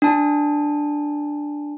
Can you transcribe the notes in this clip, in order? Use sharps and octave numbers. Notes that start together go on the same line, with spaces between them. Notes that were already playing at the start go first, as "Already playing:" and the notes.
D4 A5